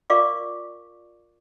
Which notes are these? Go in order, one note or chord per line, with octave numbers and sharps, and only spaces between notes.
F4 A#4 D5 F5 C#6 D6